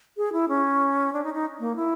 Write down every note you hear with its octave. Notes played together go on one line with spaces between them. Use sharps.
G#4
E4
C#4
D4
D#4
D#4
A#3
E4